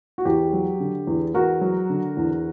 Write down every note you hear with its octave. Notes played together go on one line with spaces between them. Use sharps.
F#4
E2 G4
F#3
D3
E2
E2 F#4 A#4
F#3
D3
E2